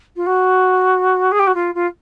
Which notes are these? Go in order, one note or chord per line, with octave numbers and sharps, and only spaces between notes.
F4
F#4
G#4
G4
F#4
F4
F4